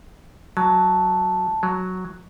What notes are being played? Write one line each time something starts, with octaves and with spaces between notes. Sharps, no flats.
F#3 A5
F#3